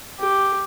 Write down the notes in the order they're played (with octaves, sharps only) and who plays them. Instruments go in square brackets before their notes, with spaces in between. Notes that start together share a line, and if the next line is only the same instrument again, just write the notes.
[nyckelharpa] G4